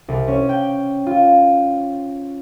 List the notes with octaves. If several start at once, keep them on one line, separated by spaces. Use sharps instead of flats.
C2
C#4
G5
F4